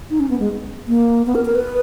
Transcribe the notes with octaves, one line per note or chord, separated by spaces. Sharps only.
D#4
C#4
B3
G#3
A#3
B3
A#4
A#4
B4